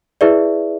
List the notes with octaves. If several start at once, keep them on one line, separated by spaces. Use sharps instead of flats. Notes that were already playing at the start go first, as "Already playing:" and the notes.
E4 G#4 B4 D5 E5